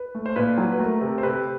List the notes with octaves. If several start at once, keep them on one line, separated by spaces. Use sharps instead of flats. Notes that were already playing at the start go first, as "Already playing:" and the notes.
Already playing: B4
A3
C5
A#2 B4
F#3
B4
A3 A#4
C3
C5
C3 B4